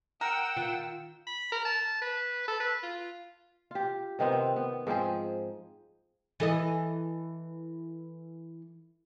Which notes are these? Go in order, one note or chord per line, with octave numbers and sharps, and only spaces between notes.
A#4 F#5 G5 E6
D#3 F4
B5
A#4
A5
B4
A4
B4
F4
F4 G4
C3 D#3 B3 C4
C4
B3
G#2 F3 C4 G#4
E3 A4 D#5